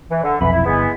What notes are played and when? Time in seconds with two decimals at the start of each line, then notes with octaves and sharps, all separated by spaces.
0.11 E3
0.23 D3
0.41 F1 B1 F2 E3 B5
0.52 E4
0.65 G1 G#3 B3 E4